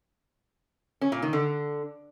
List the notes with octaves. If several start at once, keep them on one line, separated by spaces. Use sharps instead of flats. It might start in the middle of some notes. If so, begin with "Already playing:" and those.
C#4
A#2
D#3
D3